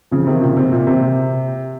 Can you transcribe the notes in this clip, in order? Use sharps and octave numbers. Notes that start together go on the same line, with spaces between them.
C#3 F3
C3 D#3
A#2 C#3
C3
A#2
C3